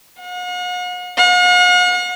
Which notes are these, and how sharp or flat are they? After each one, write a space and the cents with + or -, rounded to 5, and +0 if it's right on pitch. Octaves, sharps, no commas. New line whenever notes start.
F#5 -45
F#5 -45